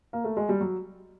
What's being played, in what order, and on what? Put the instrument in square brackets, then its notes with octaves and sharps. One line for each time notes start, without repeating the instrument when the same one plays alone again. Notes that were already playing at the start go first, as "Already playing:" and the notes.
[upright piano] A#3
A3
G#3
G3
F#3